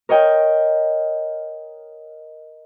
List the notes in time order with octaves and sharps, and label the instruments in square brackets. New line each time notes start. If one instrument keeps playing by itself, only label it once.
[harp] A#4 C#5 D#5 G5